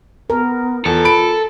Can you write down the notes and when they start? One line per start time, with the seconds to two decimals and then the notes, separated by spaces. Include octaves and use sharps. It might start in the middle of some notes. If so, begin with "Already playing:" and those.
0.30 B3 A#4
0.86 E2 F4 A4
1.05 B5 D7